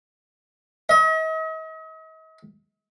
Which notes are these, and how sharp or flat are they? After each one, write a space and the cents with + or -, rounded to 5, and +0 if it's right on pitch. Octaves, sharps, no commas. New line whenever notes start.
D#5 +45